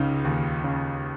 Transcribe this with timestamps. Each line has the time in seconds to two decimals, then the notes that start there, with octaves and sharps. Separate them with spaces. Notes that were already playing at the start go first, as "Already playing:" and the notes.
Already playing: C#2 C#3 D#4
0.24 D#2
0.64 C#3